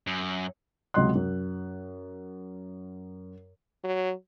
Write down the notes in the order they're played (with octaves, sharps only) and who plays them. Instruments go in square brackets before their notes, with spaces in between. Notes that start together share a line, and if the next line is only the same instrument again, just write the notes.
[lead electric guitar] F#2
[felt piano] C#2 C3 F#3 D#5 C6 F#6
F#2
[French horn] F#3